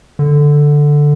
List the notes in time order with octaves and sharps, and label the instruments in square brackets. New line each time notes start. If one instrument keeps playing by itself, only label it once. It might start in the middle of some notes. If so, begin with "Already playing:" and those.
[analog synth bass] D3